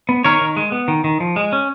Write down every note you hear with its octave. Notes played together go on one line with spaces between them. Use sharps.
B3
D#3 A#4 C#5
D#3
G#3
B3
D#3
D#3
F3
G#3
C#4